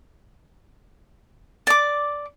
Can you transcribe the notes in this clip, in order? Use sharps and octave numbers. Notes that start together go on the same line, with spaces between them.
D5 D6